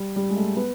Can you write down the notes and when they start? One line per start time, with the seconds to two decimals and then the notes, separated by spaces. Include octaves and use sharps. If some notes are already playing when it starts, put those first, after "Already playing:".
Already playing: G3
0.16 G3
0.30 G#3
0.36 A3
0.56 B3